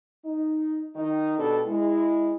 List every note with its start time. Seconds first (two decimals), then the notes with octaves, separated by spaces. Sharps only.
0.25 D#4
0.96 D#3 D#4
1.37 B2 B3 D4 G4 A4
1.66 G#3 E4